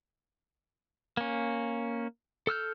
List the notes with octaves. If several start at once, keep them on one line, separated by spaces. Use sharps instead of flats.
A#3 C#4
A4 E6 F6 G6